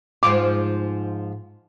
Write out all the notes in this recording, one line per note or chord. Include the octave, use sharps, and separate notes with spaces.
G#2 F3 F4 D6